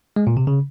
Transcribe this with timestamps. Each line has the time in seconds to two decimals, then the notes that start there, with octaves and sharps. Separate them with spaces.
0.16 G#3
0.27 A#2
0.37 C3
0.47 C#3